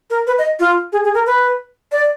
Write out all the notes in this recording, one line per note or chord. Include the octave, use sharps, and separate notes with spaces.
A#4
B4
D#5
F4
G#4
G#4
A#4
B4
D5